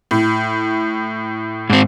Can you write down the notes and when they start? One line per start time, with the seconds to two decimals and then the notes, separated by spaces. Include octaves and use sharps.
0.11 A2
1.70 G#2 C4